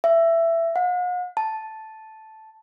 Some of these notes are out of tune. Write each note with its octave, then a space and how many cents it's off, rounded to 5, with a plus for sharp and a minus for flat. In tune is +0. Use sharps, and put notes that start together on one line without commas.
E5 +15
F#5 -45
A5 -5